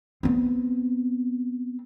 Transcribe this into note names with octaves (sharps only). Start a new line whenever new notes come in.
B3 C4